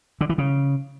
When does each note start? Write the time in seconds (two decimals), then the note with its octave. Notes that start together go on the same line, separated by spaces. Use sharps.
0.21 D3
0.29 E3
0.38 C#3